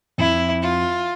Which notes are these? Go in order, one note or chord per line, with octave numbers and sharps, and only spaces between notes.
F2 E4
F4